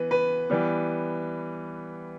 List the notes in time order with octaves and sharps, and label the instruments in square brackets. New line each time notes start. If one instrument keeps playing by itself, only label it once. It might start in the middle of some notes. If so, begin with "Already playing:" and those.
Already playing: [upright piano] E3 B3 B4
B4
E3 G3 B3